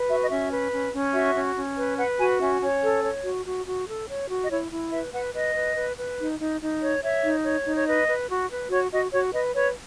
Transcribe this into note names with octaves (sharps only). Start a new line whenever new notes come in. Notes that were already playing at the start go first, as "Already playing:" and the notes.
Already playing: B4
F#4 E5
D#5
C#4 E5
B4
C#4
C#4
F#4 E5
C#4
C#4
B4
B4 F#5
F#4 G#5
C#4 E5
C#4 C#5
A4
C#5
F#4
F#4
F#4
A4
C#5
F#4
D#5
E4 C#5
E4
B4 E5
B4 F#5
B4 D#5
B4
B4
B4
D#4
D#4
D#4
C#5
C#5 E5
D#4
C#5
D#4
C#5
B4 D#5
B4
F#4
B4
F#4 C#5
F#4 D#5
F#4 C#5
B4 D#5
B4 C#5